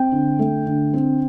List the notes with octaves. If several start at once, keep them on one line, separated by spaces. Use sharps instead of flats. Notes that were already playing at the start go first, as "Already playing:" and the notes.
Already playing: C4 G5
D3
A3
D3
C4